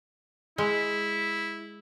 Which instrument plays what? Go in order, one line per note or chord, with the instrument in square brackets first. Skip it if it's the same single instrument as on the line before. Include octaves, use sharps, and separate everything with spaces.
[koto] G#3 [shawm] E4